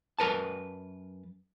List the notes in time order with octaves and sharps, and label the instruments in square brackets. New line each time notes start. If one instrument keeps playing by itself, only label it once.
[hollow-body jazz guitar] F#2 A#4 B4 A5